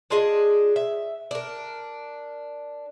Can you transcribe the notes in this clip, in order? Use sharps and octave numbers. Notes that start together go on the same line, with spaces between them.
D4 F4 G#4 D#5
E5
D4 A#4